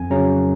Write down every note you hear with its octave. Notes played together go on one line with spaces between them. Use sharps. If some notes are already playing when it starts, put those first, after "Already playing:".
Already playing: F2 G#5
C#3 F#3 C#4 A#5